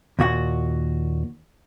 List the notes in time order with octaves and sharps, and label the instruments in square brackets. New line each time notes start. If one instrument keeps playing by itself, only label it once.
[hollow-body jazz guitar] D#2 A#2 F#4 F#5